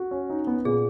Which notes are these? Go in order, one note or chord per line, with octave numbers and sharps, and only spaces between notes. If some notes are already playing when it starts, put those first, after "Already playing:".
Already playing: F#4
C#4
D#4
B3
A#2 G#4